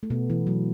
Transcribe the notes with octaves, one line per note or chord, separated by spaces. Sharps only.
A3
B2 B3
E3
F#3